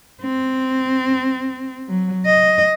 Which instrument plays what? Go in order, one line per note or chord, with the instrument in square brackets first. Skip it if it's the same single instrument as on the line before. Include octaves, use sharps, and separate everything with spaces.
[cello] C4
F#3
D#5